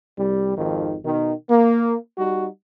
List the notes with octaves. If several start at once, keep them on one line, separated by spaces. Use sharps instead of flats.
C2 G3
G#1 F2 D#3
B2 D#3
A#3
G3 D#4 F#4